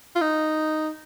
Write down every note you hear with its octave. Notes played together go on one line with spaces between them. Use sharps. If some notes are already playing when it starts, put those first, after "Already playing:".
F4
D#4